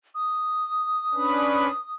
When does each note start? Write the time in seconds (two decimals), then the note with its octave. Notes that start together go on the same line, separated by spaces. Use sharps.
0.15 D#6
1.14 C#4 D4 B4